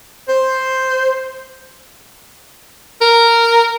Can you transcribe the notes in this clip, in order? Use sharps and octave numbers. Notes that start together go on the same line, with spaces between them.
C5
A#4